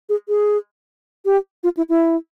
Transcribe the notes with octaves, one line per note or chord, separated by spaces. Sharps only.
G#4
G#4
G4
F4
E4
E4